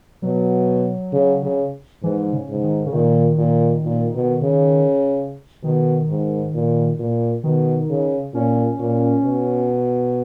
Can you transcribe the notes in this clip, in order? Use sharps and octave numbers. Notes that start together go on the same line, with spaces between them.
B2 F#3
C#3
C#3
G#2 E3
C#3
G#2
D#3
C#3
A#2 D#3
A#2
A#2
B2
C#3
B2 D#3
G#2
A#2
A#2
B2 D#3
C#3
A#2 C#4
A#2
B2